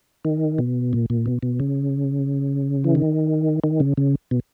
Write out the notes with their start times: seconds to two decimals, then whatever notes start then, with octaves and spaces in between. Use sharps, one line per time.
0.25 D#3
0.58 B2
0.93 A#2
1.10 A#2
1.26 B2
1.43 B2
1.60 C#3
2.84 E3
2.95 D#3
3.64 D#3
3.80 C#3
3.97 C#3
4.31 B2